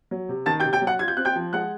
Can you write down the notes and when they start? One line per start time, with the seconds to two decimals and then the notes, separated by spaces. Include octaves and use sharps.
0.11 F#3
0.29 C3
0.46 D#3 A5 A6
0.60 G5 G6
0.65 C3
0.73 G5 G6
0.82 F#3
0.87 F#5 F#6
0.99 F4 G#6
1.08 G6
1.17 C4 F#6
1.25 G5 G6
1.36 F3
1.53 G#3 F#5 F#6